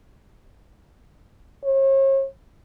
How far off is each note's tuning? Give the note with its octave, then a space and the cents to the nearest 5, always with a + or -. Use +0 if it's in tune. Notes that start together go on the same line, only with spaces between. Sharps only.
C#5 -40